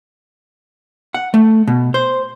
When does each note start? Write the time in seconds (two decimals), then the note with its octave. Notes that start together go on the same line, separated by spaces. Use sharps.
1.14 F#5
1.34 A3
1.67 B2
1.94 C5